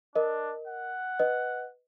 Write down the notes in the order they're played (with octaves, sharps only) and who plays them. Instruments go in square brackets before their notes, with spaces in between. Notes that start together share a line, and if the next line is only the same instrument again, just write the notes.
[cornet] D4 [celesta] A#4 D#5
[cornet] F#5
[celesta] B4 D#5